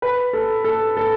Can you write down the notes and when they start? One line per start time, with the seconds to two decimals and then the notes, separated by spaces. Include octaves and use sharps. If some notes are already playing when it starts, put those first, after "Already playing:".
0.02 B4
0.33 A4
0.64 A4
0.97 A4